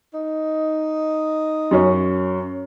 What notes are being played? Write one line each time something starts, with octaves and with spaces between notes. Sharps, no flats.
D#4
F#2 C#4